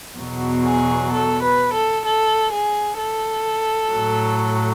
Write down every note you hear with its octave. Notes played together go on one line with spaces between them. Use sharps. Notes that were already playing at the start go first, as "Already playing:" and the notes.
E2 B2 F#3
G#4
A4
B4
A4
A4
G#4
A4
A2 F#3